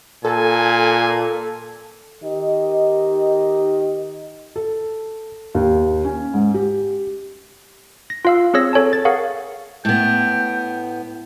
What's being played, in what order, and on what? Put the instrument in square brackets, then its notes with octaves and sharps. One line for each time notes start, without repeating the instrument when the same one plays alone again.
[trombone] A#2 [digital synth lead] A4 [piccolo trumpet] G#5
[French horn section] D#3 G4 D#5
[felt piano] A4
D#2
C#4
G#2
G4
[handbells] A#6
F4 F5 E6
C4 G#4 C#5 E6 A#6
A4 C#5 G#5 A5
A6
G#4 A#4 F5 F#5 C#6
[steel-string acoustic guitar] A2 B3 [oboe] G5